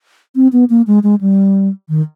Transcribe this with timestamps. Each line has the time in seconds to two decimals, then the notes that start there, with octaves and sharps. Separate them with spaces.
0.36 C4
0.53 B3
0.70 A#3
0.87 G#3
1.03 G#3
1.21 G3
1.89 D#3